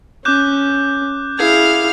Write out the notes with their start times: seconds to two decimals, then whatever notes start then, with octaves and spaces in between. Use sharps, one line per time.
0.25 C#4 D6 F#6 G6
1.39 E4 G#4 F5 F6 G#6